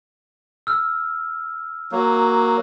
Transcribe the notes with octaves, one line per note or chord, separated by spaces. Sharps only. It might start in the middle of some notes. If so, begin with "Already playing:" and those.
E6 F6
F#3 A#3